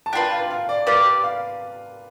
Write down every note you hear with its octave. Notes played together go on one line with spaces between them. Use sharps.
A5
D4 F4 B4 G5
F5
F5
D5
G4 B4 D5 F5
F5